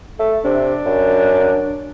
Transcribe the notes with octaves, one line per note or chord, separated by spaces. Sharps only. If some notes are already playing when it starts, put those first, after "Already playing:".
A3 A4
C3 D4
F#2